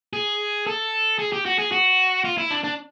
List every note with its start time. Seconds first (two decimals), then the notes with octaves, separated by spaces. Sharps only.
0.13 G#4
0.67 A4
1.19 G#4
1.32 G4
1.45 F#4
1.59 G#4
1.71 F#4
2.24 F4
2.38 E4
2.51 D4
2.64 D4